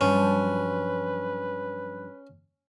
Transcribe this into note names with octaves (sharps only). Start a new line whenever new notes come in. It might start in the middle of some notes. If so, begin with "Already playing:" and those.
G2 F3 F#3 C#4 B4